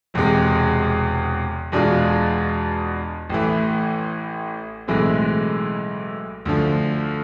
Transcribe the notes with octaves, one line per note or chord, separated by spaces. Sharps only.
E1 E2 C3 G#3
E2 B2 G#3 D4 F4
A1 A2 E3
B1 A2 E3 G#3 C4
D2 D3 F3